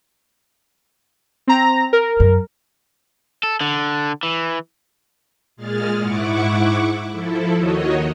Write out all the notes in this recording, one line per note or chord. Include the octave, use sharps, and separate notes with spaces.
C4 A#5 A#6
A#4
F#2
A4
D3
E3
A#2 G#3 G#4 F6 A6
G#2 E4 F#5 C#6 D6
F3 E4 A4
D#2 D#3 F#4 C#5 D#5